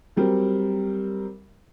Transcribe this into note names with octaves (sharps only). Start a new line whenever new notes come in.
F#3 G3 C4 A#4